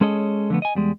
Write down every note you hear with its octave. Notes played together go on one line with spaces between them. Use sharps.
G#3 C#4 G#4 A4 C#5 D#5
D3 F3 A3 B3
D#5 G#5
E2 G3 G#3